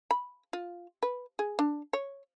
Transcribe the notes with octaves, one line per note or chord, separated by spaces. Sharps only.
B5
F4
B4
G#4
D4
C#5